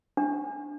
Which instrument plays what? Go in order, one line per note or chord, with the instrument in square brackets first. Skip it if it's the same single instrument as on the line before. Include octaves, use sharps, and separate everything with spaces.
[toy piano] D4